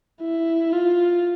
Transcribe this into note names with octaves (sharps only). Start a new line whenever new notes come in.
E4
F4